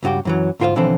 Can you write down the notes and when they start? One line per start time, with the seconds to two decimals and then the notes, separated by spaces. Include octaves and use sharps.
0.03 C#2 G2 D#4 F#4 G4
0.25 F#2 E3 F#3
0.60 D2 G#2 F4 A#4 C5 F5
0.76 B1 D3 E3 F3 C4 E4